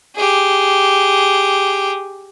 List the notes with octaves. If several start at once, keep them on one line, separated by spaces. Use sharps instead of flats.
G4 G#4